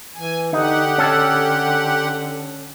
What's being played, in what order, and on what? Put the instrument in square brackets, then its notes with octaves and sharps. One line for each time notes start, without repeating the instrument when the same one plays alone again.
[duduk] E3 [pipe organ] G#5
[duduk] D3 [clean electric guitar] D#4 [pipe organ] G4 F#5
[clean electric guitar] C#4 A4